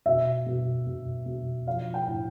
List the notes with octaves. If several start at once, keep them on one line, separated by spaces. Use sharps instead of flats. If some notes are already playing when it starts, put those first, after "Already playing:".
B2 E5
B2
B2
B2
F3 F5
G5
A2